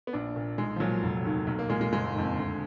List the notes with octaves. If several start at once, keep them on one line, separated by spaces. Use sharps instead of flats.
B3
A#1 D4
A#2
B1 G#3
F3
A#2 F#3
F1
D#2 D#3
B1
A#3
A#2 G#3
G#3
F#1 G#3
F2 D#3
D2